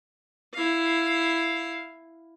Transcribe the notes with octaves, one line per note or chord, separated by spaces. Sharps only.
E4 F5